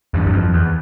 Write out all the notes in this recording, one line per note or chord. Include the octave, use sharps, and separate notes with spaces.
E2 G2
E2
F2
E2